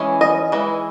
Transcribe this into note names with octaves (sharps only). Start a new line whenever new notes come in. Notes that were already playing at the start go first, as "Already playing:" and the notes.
Already playing: E3 G#3 C#4
D#5
E3 G#3